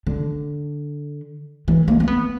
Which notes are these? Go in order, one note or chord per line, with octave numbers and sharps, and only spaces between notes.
D3
E3
A#3
C4
B3